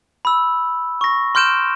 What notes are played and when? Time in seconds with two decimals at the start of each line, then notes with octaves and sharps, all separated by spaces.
0.25 B5 E6
1.01 C#6 A#6
1.35 C6 F6 G6 D7 E7